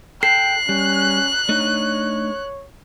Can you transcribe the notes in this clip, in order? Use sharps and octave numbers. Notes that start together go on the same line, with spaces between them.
A4 G5 F#6 C7
G3 C#4
A3 D4 D#4 C#5